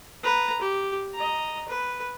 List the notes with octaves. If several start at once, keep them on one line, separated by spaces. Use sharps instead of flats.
B4 A#5
G4
D#5 A#5
B4